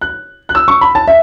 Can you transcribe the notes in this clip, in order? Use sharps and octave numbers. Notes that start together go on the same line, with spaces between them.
F#6
F#6
E6
C#6
B5
A5
E5